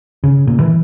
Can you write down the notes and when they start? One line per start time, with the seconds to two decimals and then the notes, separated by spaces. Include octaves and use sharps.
0.24 C#3
0.47 A#2
0.60 E3